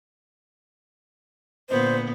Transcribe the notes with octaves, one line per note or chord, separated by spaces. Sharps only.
A#2 D3 B3 C5